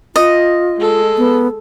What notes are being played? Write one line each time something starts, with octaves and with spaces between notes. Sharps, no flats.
F4 D#5
G#3 A4
B3